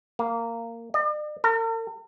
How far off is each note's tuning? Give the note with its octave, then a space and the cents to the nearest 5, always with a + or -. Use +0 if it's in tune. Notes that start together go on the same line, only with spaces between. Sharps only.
A#3 -15
D5 +45
A#4 -45